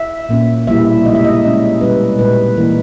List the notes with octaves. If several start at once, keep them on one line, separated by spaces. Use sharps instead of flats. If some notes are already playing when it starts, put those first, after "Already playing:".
Already playing: E5
A#2 A#3 C#4
B2 G3 A#3 E4 E5
C#3 G#3 D#4 D#5
E5
D#5
C#3 G#3 C#4
B2 G3 C#4 B4
A#2 G#3 D#4 B4
E3 A#3 E4 A#4